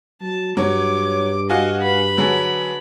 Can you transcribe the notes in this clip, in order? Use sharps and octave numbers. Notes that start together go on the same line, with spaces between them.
F#3 A5
G2 F#3 C#5 D6
F#4 D#5 F5 G#5
B4 B5
D3 F#3 G#4